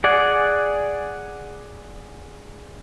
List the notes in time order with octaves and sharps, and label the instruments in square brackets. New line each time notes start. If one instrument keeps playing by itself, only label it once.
[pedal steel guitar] G#4 D5 F#5 G#5